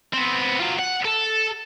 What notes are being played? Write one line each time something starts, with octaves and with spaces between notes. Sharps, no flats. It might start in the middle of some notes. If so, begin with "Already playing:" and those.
B3 C4
F#3 F4
F#5
A4 A5